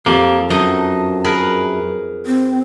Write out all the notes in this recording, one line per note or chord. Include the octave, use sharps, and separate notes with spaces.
F2 F3 A#3 G4
F#2 D#4 D#5 A5
G#4 A#4 B4
C4